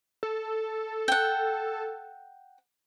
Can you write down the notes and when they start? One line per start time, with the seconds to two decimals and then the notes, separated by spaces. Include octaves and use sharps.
0.23 A4
1.08 F#5 G5